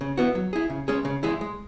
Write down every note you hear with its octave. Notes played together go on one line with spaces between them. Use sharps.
C#3
E3 B3 F#4
F#3
E4 G#4
C#3
G#3 C#4 G#4
C#3
E3 G#3 E4 G#4
G#3